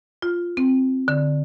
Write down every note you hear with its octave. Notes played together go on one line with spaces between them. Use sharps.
F4
C4
D3